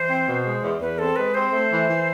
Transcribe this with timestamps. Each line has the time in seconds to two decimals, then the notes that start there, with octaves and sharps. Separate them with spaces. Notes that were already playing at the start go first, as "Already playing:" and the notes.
Already playing: E3 C5
0.09 C4
0.28 B2
0.45 G#3
0.63 E2
0.80 E2 B4
0.99 C4 A4
1.16 G#3 B4
1.34 C4 C5
1.52 A3
1.71 E3
1.88 E3